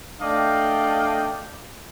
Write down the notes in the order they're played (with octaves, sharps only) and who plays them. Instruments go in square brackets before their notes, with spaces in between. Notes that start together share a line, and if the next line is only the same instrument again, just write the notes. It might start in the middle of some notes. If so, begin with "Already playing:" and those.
[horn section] A3 D4 D5 D#5 F5 G5